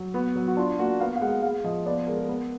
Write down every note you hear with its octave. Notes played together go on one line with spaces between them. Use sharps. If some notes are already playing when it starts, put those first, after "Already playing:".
Already playing: F#3
B3 F#4
F#3
F#4
D4 F4
A#3 F#4
B3 F5
F5
G#3 F#5
G#3 F5
F3 D#5
B3 D5
G#3 A#4
G#4
B3 A#4